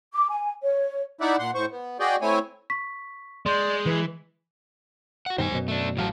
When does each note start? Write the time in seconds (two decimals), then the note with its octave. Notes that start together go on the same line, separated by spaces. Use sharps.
0.13 D6
0.29 G#5
0.62 C#5
1.21 D#4 E4 D5 E5 F#5
1.39 A#2 F#5 C6
1.55 A2 C5 C#6
1.71 B3
2.00 F#4 G#4 D5 D#5 G5
2.22 A3 C4 E4 C#5 G#5
2.70 C#6 B6
3.46 G#3 D5 C6 G6
3.86 E3 B4
5.26 F#4 F#5
5.38 G2 B2 D#3 C5 G5 G#5
5.51 F#2 B2
5.68 A3 D4
5.97 A1 A2 F#3 F5 A5